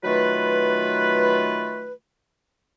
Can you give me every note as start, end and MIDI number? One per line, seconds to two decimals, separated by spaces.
0.04 1.92 51
0.04 1.92 54
0.04 1.92 57
0.04 1.92 65
0.04 1.92 71